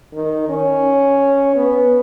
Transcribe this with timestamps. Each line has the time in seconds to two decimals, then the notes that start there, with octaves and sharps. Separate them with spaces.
0.14 D#3
0.49 C#4
1.56 B3